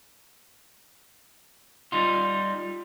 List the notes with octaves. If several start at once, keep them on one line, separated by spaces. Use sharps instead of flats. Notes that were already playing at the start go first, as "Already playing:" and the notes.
G3 D#4 F4